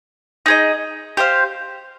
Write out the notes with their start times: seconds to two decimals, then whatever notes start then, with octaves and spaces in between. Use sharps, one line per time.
0.46 D#4 G#4 D#5
1.17 G4 C5 F5